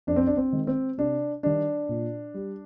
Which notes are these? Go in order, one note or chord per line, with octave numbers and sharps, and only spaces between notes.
F2 D4
C4
D4
C4
D#3 G#3
C4
C3 D4
D#3 G3 D4
A#2
G3